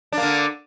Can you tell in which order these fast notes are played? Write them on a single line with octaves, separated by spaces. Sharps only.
D4 A#3 D3